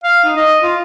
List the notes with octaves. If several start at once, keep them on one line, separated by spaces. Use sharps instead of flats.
F5
D#4
D#5
F4